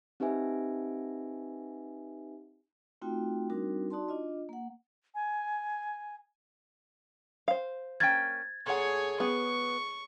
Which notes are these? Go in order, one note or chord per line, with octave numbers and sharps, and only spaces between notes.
C4 D#4 G4 B4 E5 G#5
A3 C4 D#4 F4 F#4 G5
G3 C4 D4 D#4 F#4 A#4
D#4 F#4 D5 A5 C6
D4 F4 D#5
A#3 F#5
G#5
C5 F5
A#3 C#4 G5 G#6 A6
A#2 G#4 A4 C#5 F#5
B3 G#4 C#6